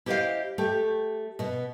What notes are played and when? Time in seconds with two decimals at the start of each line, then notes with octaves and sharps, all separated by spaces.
0.06 E4 G4 C5 C#5 D#5 F5
0.58 A3 G4 A4
1.39 B2 B3